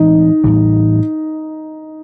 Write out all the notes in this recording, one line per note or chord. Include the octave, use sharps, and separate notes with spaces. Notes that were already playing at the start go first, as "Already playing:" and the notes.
Already playing: A2 E3 G#3 C4 D#4 D#5
A2 E3 G3